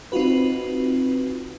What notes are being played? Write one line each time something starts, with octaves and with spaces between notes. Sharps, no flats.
C4 D#4 F4 F#4 B4